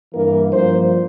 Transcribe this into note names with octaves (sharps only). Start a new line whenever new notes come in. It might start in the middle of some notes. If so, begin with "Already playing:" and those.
G2 E3 A#3 A#4
G2 F3 A#3 C5